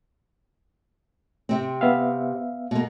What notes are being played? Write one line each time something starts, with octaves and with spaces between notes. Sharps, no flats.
C3 C4
B3 E5 F5
B2 A#3